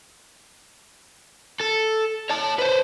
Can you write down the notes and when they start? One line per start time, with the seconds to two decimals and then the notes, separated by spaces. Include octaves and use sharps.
1.60 A4
2.30 C#5 A5
2.59 B4 C5